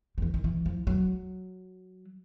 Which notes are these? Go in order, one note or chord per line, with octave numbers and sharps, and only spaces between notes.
F3
E3
D#3
E3
F3
F#3